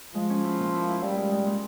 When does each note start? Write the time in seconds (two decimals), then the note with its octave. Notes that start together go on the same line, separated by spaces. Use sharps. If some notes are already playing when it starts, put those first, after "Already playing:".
0.15 F3 G#3
0.30 C#4
0.44 E4
0.59 A#2
0.73 E4
0.88 E4
1.02 G3 E4
1.17 G#3
1.31 G#3
1.46 A#2